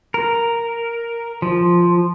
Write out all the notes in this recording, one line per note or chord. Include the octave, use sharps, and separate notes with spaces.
A#4
F3